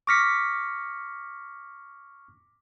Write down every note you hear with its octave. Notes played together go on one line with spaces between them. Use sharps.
C#6 D6 F6 A#6 B6 C#7